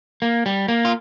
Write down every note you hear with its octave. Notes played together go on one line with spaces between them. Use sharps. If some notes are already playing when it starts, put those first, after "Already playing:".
A#3
G3
A#3
F4